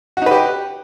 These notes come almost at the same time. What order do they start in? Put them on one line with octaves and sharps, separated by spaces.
F#4 D#4 B4 G4